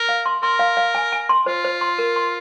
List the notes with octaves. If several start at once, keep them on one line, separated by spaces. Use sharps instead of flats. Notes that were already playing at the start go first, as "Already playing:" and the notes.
Already playing: A#4
F5
C6
A#4 C6
F5
F5
G#5
G#5
C6
F4 C5
C5
C6
A#4
C6